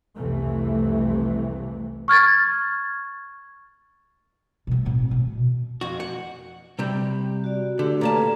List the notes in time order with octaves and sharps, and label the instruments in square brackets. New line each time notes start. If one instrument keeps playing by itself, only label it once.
[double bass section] C2 F2 C3 E3 A3
[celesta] C#6 F6 G#6 A6
[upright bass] B2 F3
A2 C4
B2
[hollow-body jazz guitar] F2 F#4
F#5
C3 G3 G4
[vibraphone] F#4 D5
[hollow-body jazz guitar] D3 [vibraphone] A3 G4
[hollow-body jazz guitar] A#2 C#4 A5 [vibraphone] A4 B4 A#5